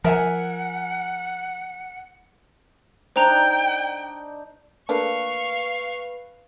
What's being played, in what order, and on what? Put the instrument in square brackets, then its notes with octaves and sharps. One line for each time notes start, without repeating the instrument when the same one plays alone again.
[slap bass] F3 [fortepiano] A#4 E5 G#5 [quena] F#5
[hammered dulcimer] D4 D#4 [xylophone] C5 A#5 [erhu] G5
[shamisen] A3 A#3 D4 [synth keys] B4 [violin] F5 C#6